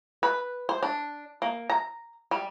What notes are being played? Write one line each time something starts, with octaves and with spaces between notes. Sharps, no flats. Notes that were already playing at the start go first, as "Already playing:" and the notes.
B4
C5
D4
A#3
A#5
G3